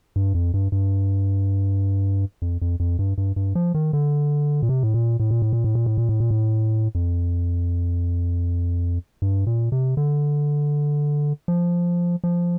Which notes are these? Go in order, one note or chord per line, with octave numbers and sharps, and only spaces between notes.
G2
F2
G2
G2
F2
F2
F2
G2
G2
G2
F3
D#3
D3
A#2
C3
A2
A#2
A2
A#2
A2
A#2
A2
A#2
A2
A#2
A2
A#2
A2
F2
G2
A#2
C3
D3
F3
F3